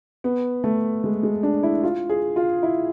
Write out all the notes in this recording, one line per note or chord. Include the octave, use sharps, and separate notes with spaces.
B3
A3
G#3
G#3
D4
E4
F4
G#4
F4
E4